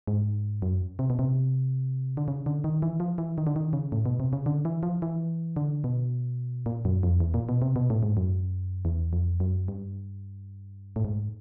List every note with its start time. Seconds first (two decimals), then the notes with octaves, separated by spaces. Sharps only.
0.07 G#2
0.62 F#2
0.99 C3
1.10 B2
1.19 C3
2.17 D3
2.28 C#3
2.46 D3
2.64 D#3
2.82 E3
3.00 F3
3.18 E3
3.38 D#3
3.47 D3
3.56 D#3
3.73 C#3
3.92 A2
4.06 B2
4.20 C3
4.33 C#3
4.46 D3
4.65 E3
4.83 F3
5.02 E3
5.56 D3
5.84 B2
6.66 A#2
6.85 F#2
7.03 F2
7.20 E2
7.34 A#2
7.49 B2
7.62 C3
7.76 B2
7.90 A2
8.03 G#2
8.17 F#2
8.85 E2
9.13 F2
9.40 F#2
9.68 G2
10.96 A2
11.05 G#2